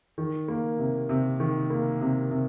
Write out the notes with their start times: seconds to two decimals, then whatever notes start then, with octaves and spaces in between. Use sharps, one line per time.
0.18 D#3
0.48 A#3
0.79 C3
1.09 C3
1.40 D#3
1.70 A#3
2.01 C3
2.31 C3